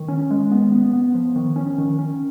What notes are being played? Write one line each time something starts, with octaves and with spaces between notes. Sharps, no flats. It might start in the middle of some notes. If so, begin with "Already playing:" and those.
Already playing: D#3
C#4
G#3
B3
B3
B3
F3
D#3
C#4
D#3
C#4